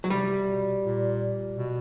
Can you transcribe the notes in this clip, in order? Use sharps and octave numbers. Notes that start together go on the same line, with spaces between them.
F#3
C3 G3
B2
A#2
B2